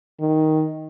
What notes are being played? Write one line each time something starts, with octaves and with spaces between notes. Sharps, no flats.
D#3